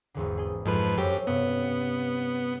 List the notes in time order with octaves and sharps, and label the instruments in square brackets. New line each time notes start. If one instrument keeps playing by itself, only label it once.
[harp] G#1 E2 D3
G#4 D#5
[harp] F2 A3 [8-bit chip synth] G#2 F3 B4
[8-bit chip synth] F#2 G4 [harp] C5 C#5 E5
[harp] G2 C3 C#4 [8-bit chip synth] B3